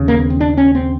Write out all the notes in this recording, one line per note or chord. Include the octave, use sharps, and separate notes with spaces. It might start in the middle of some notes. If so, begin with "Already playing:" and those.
Already playing: D#2 C#3
A#3
B3
C4
D4
C#4
C4